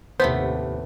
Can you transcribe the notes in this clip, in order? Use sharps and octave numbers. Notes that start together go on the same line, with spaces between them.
D#2 A2 C3 A3 B3 C5